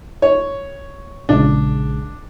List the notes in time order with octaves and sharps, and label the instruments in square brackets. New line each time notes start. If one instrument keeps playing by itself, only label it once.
[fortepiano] C#5
[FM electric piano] A#1 C#3 G#3 [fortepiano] D4